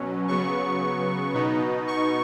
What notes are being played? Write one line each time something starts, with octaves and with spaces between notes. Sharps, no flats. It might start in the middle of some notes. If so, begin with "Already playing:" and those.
Already playing: B2 F#3 C#4
C#3 F#3 B3 C#6
B2 B3 D#4
C#6